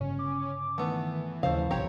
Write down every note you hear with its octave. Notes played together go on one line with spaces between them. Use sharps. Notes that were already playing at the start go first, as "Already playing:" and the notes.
G1 C#3 C#4
D6
D#3 E3 A3 B3
D#2 C#3 F3 A3 C5 F5
G1 C2 B2 C4 G4 C#5 A#5